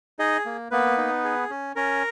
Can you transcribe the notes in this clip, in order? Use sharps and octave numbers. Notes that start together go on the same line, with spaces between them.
D#4 G#4 D#5
A#3
A#3 B3 B4
D#4
G#4
C#4
C#4 A#4